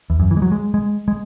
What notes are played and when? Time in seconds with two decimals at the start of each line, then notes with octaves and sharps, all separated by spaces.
0.10 E2
0.20 F#2
0.31 E3
0.37 G#3
0.42 F#3
0.52 G#3
0.74 G#3
1.08 G#3